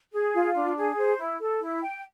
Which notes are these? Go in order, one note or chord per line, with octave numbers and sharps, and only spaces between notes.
G#4
F4
D4
G#4
C5
E4
A4
E4
G5